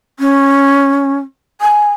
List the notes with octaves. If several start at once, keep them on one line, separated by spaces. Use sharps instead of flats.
C#4
G#5